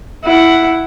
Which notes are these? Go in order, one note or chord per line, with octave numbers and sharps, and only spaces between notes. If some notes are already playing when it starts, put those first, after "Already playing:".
E4 F#5